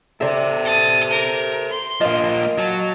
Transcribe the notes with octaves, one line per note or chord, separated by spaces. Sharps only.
A4 C5 D5 E5
A5 D#6
A#4
C6
F3 A#3 D#5 F5
F#3 A5